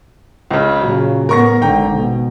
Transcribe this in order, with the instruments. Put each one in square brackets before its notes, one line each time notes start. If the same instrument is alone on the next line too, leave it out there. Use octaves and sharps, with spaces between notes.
[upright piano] C#2 C#3
[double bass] A#2 C#3 [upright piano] F#3
[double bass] A2 B3 [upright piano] A#4 C#6 A#6
[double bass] G#1 D3 [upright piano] G5 A#5
[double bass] B2